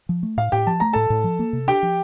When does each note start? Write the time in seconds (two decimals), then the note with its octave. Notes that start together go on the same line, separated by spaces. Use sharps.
0.09 F3
0.23 A3
0.37 A2 F5
0.52 A2 G4 G5
0.67 F3 A5
0.80 A3 A#5
0.93 A2 A4 A5
1.10 A2
1.24 F3
1.39 A#3
1.53 C3
1.67 D4 G4 G5
1.83 F3